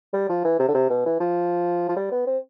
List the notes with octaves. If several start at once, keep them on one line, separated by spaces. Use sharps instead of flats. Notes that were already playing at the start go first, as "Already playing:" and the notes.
G3
F3
E3
C3
D3
C3
B2
E3
F3
F3
G3
B3
C4